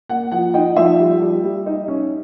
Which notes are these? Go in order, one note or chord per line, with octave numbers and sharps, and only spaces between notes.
A#3 F#5
F3 F#5
D#4 G5
F3 E5
G3
G3
G3
D#4
C#4